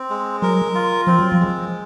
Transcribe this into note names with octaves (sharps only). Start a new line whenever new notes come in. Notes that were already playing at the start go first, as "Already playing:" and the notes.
Already playing: C4
G#3
F#3 A#4
F4
F3 C4
F#3
F3
G#3